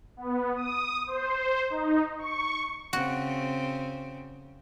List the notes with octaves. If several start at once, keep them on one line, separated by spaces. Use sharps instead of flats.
B3
D#6
C5
D#4
C#6
C#3 C4 F#4